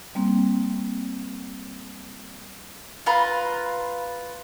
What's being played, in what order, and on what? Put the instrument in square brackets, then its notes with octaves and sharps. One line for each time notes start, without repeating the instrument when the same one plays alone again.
[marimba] G3 A#3 C4
[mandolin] F4 B4 A#5